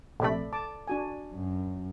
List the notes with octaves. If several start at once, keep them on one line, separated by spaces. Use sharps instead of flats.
A#1 C3 A3 A4 D5 B5
A5 D6
D4 F#4 G#5
F#2